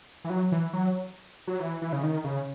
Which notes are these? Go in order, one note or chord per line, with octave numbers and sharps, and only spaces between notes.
E3
F#3
E3
F#3
F#3
E3
E3
C#3
D#3
C#3